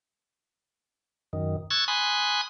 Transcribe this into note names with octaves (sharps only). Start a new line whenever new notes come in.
F#2 D#3
C#6 E6 F#6 G#6 A6
G#5 B5 C6 D#6 F#6